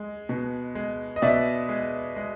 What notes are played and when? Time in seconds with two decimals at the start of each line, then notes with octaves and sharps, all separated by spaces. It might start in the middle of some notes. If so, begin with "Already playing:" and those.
Already playing: G#3
0.29 B2
0.75 G#3
1.16 D#5
1.22 B2 D5 E5
1.69 G#3
2.16 G#3